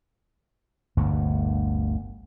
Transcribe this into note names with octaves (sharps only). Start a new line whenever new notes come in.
G1 D2 G2 A#2